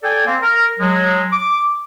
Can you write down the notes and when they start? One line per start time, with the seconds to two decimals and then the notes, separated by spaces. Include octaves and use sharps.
0.03 A4 D5 G5 G#5
0.26 A#3 C4
0.42 A#4
0.79 F#3 G#3
1.32 D6